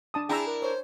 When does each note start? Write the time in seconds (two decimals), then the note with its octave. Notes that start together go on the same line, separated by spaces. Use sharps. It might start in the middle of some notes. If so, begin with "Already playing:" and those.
0.14 D4 A5 D#6
0.29 D4 E4 G#4 G5 A#5 E6
0.47 A#4
0.62 C5 C#5